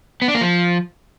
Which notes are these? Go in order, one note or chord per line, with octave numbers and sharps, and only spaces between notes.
B3
D4
A#3
F3